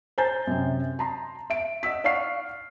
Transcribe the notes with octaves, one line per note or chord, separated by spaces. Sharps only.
C5 G#5 A#5 G6 A6
F#2 C3 C4
A5 A#5 C6
E5 D7
D#5 F#5 E6 B6
D5 F5 F#5 C#6 F6 C7